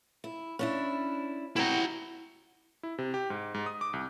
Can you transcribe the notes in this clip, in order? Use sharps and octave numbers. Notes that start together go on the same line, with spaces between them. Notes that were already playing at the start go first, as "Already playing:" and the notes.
E4
C#4 D4 E4
C4 E4 F#4 G#4 A#5
E4
C3
G4
G#2
G#2
D#6
D6
C2